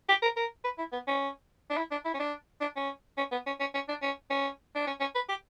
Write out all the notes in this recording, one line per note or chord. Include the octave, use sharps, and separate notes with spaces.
G4
A#4
A#4
B4
E4
B3
C#4
D4
E4
D4
E4
C#4
D4
D4
C#4
C#4
B3
C#4
C#4
C#4
D4
C#4
C#4
D4
C#4
C#4
B4
G4